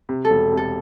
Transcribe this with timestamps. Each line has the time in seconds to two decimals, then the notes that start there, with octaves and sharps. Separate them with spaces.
0.09 C3
0.25 A4
0.30 E1
0.52 C3
0.57 A4